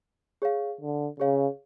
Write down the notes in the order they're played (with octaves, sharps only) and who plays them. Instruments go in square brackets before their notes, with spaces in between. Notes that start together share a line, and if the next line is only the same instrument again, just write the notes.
[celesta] G#4 C#5 F5
[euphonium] D3
[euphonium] C#3 [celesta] G#4 C#5 F5